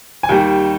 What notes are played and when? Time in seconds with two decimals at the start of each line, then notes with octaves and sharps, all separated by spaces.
0.23 G#5
0.29 D#2 D#3 G3 G5